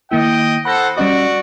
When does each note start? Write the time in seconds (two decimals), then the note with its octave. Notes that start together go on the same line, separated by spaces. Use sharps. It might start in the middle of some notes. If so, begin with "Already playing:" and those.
0.11 D#3 A#3 E4 D#5 G5
0.65 A4 C5 F#5 B5 A#6
0.97 G3 C#4 F#4 D5 D#5